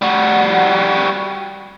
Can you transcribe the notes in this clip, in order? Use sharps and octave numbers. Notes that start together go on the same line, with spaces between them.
G3 F#4